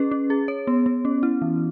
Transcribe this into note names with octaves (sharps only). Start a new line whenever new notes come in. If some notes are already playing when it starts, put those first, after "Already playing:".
Already playing: C#4 G#4 B4
C#4
G#4
C#5
B3
B3
C#4
E4
E3